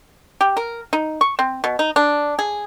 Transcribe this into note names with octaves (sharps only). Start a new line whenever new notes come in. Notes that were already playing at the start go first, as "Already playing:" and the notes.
G4
A#4
D#4
C#6
C4
B2
D#4
D4
G#4